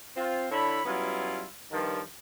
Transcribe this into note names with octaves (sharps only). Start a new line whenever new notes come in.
C4 F4
D3 D4 E4 C#5 B5
F#3 G3 B3 C#4 E4 F4
G2 D#3 F3